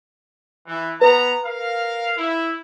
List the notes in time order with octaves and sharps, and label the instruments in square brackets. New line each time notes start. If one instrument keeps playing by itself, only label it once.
[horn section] E3
[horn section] B3 A#5 [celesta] B4
[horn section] A#4 F5
E4